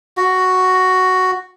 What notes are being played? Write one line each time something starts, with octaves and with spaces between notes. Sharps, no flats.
F#4